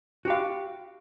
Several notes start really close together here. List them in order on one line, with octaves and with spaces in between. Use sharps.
F#4 G4 F5